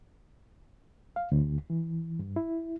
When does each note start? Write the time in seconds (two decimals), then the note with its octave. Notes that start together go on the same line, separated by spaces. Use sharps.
1.16 F5
1.32 D2
1.70 E3
2.19 G2
2.36 E4